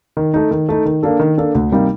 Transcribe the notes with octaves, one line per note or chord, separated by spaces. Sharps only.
D#3
A3 D#4
D#3
A3 D#4
D#3
A#3 D4 A4
D#3
A#3 D4 A4
D2
C3 G3 A#3 D#4